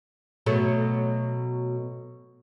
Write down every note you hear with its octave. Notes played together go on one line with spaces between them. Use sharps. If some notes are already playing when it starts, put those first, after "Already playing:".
B2 F#3 A3